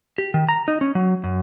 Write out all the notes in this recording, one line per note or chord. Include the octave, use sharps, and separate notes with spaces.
G4
D#3
A#5
D#4
C#4
F#3
F#2